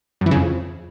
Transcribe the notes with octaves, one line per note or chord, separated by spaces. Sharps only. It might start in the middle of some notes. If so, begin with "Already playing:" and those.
F#2
E3
C#3
F2